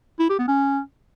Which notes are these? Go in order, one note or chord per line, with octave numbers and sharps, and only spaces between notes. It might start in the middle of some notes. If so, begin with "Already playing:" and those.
E4
G4
B3
C#4